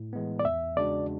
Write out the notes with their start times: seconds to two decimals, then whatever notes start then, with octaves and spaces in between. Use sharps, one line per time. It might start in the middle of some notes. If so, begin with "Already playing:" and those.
Already playing: A2
0.13 E3 G#3 B3
0.39 D5
0.45 E2 E5
0.76 C#3 G#3 D4 F#4 D5